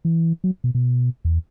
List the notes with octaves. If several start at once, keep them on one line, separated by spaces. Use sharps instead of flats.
E3
F#3
B2
B2
E2